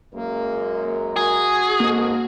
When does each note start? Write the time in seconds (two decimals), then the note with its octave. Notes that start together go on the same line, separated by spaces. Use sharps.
0.14 F#2 G#3 A#3 A#4
1.16 F#4 G#4
1.80 G#2 A#3 A4